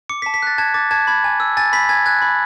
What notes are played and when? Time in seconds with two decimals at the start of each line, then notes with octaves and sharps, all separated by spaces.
0.09 D6 C#7
0.22 B6
0.26 A5
0.34 B6
0.42 F#6 A6
0.58 A5 G#6
0.74 D6 A6
0.91 A5 G#6
1.07 B5 G#6
1.24 G#5
1.40 E6
1.57 G#5 A6
1.73 B5 B6
1.89 G#5 G#6
2.06 F#6 G#6
2.22 B5